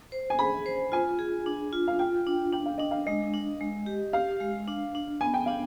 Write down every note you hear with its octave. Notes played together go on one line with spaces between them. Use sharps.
C5
G#5
G#4 B5
C5
F4 G#5
G#4
D4
F4
F5
F4 G5
D4
D4 G5
F5
D4 D#5
F5
G#3 D#5
D4
G#3
G4
G4 F5
G#3
D4
D4
B3 G#5
G5
D4 F5